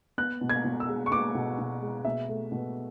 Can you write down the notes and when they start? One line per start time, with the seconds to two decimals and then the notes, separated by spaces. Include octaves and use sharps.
0.18 B3 F#6
0.41 B2
0.49 G#6
0.64 B2
0.80 E6
0.88 G#3
1.06 C#6
1.11 B3 D6
1.35 B2
1.58 B2
1.82 G#3
2.05 B2 E5
2.29 A3
2.52 B2